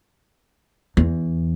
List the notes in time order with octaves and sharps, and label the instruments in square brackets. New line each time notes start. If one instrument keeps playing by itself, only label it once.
[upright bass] E2